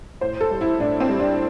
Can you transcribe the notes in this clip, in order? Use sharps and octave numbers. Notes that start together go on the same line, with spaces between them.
A2 C5
A4
G3
E4
A2 D4
C4
G3
D4